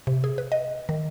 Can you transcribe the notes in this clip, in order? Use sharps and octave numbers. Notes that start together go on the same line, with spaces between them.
C3
G#4
B4
D#5
D#3